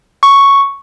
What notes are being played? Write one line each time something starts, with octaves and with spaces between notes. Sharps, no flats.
C#6